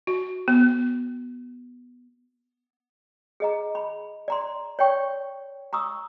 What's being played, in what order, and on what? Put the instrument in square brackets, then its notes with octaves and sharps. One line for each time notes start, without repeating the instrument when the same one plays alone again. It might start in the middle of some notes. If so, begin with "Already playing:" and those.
[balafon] F#4
B3
[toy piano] G#4 D#5 A#5
B5
D5 A#5 C6
C#5 D5 G5 C#6
A#5 C#6 D#6 E6